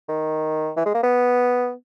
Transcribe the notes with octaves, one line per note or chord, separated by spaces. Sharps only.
D#3
E3
G#3
A#3
B3